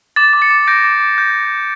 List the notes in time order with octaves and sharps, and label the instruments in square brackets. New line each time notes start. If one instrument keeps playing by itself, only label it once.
[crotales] D6 A6
D6
A6 C#7
D6
G6 A#6 D7
D6
D6
G6